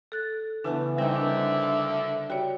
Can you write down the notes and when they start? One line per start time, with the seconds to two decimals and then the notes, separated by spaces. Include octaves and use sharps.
0.12 A4 F#6 A6
0.64 C#3 E3 A3 B3 D4
0.98 D3 G3 C4 D#4 E5
1.16 D4 A#4
1.62 F5
2.30 G3 F#4 C#5